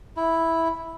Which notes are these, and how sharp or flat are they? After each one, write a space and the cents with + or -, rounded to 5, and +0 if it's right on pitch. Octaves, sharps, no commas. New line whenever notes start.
E4 -5